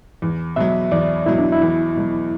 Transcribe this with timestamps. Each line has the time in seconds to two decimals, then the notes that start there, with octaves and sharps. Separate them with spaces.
0.22 E2
0.56 B2 F#3 E5
0.91 E2 D5
1.26 B2 F#3 E4
1.39 D4
1.52 E4
1.62 E2
1.96 B2 F#3